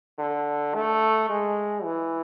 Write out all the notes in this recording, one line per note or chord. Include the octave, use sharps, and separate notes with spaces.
D3
A3
G#3
E3